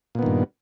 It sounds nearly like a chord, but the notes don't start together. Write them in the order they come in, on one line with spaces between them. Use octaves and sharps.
A#2 B3 D#3 G2